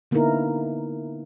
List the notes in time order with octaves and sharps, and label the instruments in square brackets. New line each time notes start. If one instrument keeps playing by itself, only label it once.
[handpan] D3 A#3 B3 D#4 E4 A#4